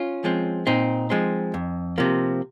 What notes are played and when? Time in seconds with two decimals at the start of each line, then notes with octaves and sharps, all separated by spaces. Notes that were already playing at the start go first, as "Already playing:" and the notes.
Already playing: C#4 F4
0.24 F3 G#3 C4
0.67 A#2 C4 D#4
1.10 F3 G#3 C4
1.54 F2
1.98 C3 F3 A#3